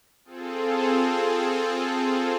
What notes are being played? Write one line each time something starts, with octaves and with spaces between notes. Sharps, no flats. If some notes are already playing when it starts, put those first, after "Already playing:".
C4 F4 G#4 A4